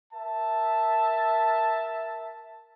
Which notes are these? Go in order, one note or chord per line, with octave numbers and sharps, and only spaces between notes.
A#4 E5 A5